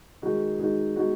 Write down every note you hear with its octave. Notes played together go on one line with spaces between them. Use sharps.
D#3 G#3 D#4 F#4
D#3 G#3 D#4 F#4
B2 G#3 D#4 F#4